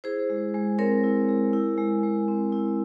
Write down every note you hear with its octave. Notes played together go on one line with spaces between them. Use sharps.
E4 G#4 C5
G#3
G#3
C4 A#4 C#5
E4
G#3
E4
G#3
G#3
C4
E4